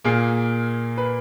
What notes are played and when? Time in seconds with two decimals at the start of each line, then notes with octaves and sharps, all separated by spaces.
0.04 A#2 A#3 G#4
0.98 B4